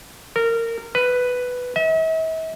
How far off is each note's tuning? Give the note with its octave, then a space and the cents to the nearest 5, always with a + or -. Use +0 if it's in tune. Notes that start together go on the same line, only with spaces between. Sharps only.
A#4 -20
B4 +5
E5 -45